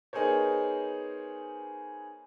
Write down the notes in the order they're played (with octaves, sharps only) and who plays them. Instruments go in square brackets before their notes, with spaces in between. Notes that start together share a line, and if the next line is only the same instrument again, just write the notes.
[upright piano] B3 D#4 G#4 A#4 C5 C#5